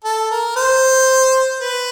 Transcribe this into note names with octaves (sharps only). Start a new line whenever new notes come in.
A4
A#4
C5
B4